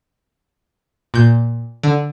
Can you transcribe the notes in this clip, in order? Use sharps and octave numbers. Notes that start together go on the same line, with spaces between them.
A#2 G6
D3